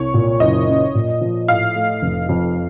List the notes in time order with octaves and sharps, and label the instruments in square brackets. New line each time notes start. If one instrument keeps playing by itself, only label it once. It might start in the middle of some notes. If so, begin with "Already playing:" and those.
Already playing: [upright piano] C2 [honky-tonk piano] C#5
[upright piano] A#2
[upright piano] F#1 [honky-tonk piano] D#5
[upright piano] F#2
A#2
F3
[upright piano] A2 [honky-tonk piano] F5
[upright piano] A3
F1
F2